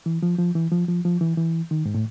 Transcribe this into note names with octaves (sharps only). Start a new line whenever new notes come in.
E3
F3
F3
E3
F3
F3
F3
E3
E3
D#3
G#2
A2